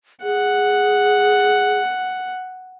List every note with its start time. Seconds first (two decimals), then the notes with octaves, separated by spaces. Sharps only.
0.23 G#4 F#5